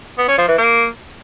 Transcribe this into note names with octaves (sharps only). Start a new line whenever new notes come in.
B3
C#4
F3
E3
A#3